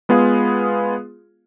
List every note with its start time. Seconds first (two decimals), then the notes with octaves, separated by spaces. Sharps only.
0.09 G#3 B3 F4 G#4 F5